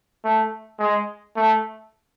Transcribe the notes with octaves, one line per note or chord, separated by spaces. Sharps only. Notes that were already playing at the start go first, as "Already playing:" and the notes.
A3
G#3
A3